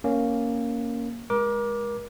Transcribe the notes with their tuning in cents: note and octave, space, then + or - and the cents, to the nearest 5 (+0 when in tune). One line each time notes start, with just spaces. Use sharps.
A#3 +0 C#4 +0
G#3 +0 A#4 +35 D6 +0